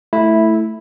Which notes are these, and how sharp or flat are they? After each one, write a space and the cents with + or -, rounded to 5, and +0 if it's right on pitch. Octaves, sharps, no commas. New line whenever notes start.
A3 +0 E4 -5